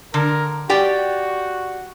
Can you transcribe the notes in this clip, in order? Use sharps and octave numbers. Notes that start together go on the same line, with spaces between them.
D3 A#4
F#4 G4 D5 G5